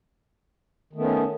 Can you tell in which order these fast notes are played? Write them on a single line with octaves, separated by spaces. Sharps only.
D#3 A3 B3 C#4